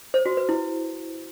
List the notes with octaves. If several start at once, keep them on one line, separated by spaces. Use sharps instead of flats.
C5
F#4
B4
E4